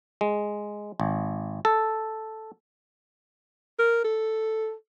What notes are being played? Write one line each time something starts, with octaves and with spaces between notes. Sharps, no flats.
G#3
G#1
A4
A#4
A4